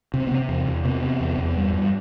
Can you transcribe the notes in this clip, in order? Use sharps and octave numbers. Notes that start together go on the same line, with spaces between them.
C3
C4
B3
C3 C4
E2
E2
C3 B3
C3
E2
E2
G2
G2